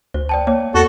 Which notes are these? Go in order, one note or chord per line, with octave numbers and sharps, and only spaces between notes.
D2 C5
D5 G5 A5
A#3 C#5
E2 F#4 A4